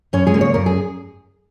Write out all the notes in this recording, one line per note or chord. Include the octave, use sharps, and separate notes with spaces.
F#2 C#4 C#5
G#3 G#4
C#3 A#3
C#5
F#2 A#4
G#4